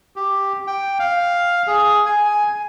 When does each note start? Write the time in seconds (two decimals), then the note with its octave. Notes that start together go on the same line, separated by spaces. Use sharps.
0.16 G4
0.67 G5
0.99 F5
1.67 G#4
2.06 G#5